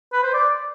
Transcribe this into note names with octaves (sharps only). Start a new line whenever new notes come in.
B4
C5
D5